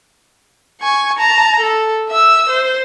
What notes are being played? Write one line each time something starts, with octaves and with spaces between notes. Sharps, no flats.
G#5 C#6
A5 A#5
A4
E5 E6
C5